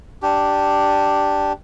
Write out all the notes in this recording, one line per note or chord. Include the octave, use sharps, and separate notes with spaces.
D4 G4